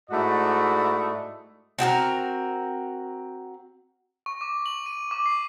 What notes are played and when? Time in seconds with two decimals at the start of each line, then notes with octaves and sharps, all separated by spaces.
0.10 G#2 A3 E4 F#4 D5 D#5
1.79 C4 F#4 G#4 A#4
4.26 C#6
4.41 D6
4.66 F#7
4.86 D#7
5.11 D6
5.26 C7